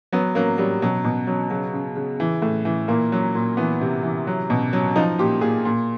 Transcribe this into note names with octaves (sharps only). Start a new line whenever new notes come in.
F#3 B3
F#3 A#3
F#3 G3
B2 F#3
B2
F#3
C#3 F#3
C#3
C#3
E3
A2
E3
A#2 A#3
F#3
A#2
E3 B3
C3
E3
F#3
B2
F#3
F3 D#4
A#2 G4
A#2 G#4
A#2